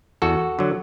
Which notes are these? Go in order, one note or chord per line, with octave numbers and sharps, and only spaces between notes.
E2 F#4 A4
D3 F#3